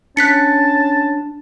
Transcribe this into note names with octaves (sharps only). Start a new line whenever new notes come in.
C#4 D4 A5 F#6 B6 C#7